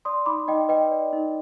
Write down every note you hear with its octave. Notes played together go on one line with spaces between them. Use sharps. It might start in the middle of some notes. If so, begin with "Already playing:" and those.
D5 C6 D#6
D#4 B5 D6
D#4 D#5 G5
B4 D#5 G5
D5
D#4